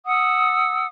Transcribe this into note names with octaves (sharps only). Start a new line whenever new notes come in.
F#5 D#6 E6